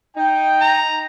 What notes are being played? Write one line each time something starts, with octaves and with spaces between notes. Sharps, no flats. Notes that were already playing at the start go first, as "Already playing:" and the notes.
D#4 G5
A#5